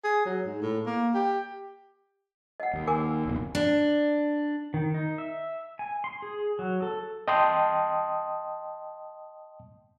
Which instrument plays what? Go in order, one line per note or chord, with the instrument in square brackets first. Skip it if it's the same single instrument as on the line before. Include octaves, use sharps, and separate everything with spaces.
[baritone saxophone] G#4
F#3
G#2
A2
A#3
G4
[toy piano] D#5 F#5
[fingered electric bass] D#2
[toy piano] A#4 G#5 D6
[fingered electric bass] D1 B1 F2
[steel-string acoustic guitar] D4
[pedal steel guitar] D#3
D#4
E5
G#5
C6
G#4
F#3
A4
[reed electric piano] D#5 G5 A5 C6 D#6